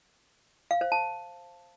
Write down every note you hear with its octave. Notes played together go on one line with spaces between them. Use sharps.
F5
C5
A5